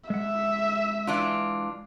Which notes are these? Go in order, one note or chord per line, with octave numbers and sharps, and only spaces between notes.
G#3 E5 F#5
E3 D4 F4